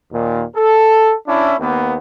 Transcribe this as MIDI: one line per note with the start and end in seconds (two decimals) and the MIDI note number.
0.12 0.42 39
0.12 0.42 46
0.55 1.13 69
1.27 1.54 61
1.27 1.54 62
1.27 1.54 64
1.60 1.97 39
1.60 1.97 58
1.60 1.97 59